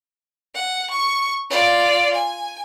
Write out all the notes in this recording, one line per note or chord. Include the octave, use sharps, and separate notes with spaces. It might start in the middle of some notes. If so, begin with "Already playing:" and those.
F#5
C#6
F4 D5
G#5